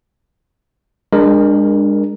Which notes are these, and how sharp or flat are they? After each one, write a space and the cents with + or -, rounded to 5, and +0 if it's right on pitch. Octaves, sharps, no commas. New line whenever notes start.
G#3 -25 D4 +10 A#4 +5